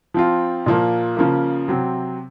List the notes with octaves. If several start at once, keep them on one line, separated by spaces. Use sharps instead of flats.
F3 C4 F4
A#2 F3 A#3
C#3 F3 A#3
C3 F#3 C4